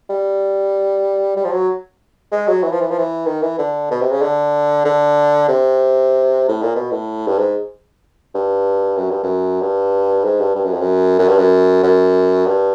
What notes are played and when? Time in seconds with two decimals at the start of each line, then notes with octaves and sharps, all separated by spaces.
0.10 G3
1.37 G3
1.45 F3
1.52 F#3
2.32 G#3
2.48 F#3
2.63 E3
2.72 F3
2.81 E3
2.91 F3
2.99 E3
3.26 D#3
3.42 E3
3.59 D3
3.91 B2
4.01 C3
4.12 C#3
4.22 D3
4.85 D3
5.49 C3
6.49 A2
6.62 A#2
6.76 B2
6.91 A2
7.27 G2
7.39 G#2
8.35 G2
8.98 F#2
9.11 G2
9.23 F#2
9.61 G2
10.24 G#2
10.41 G2
10.55 G2
10.65 F#2
10.73 F2
10.81 F#2
11.19 F#2
11.28 G2
11.38 F#2
11.83 F#2
12.46 G2